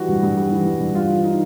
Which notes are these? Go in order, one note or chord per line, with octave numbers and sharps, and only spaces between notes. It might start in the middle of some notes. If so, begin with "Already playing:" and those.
Already playing: E3 G3 F#4
G2
G2
G3
E3
G2
G2
G3 F4
E3
D#4